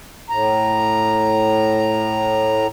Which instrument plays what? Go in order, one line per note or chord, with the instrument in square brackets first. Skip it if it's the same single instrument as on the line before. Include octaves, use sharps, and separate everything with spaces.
[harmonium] A2 A#5